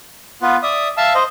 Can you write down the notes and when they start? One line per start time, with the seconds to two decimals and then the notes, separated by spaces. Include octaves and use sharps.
0.42 B3 F4 B4
0.63 D5 E5 D#6
0.97 E5 F5 A5 E6
1.15 C5 D#5